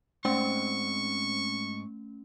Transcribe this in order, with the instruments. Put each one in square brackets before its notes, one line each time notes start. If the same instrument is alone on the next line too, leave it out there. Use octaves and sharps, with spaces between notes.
[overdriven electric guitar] G#2 [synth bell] A3 C#4 [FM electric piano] C4 [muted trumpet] C#6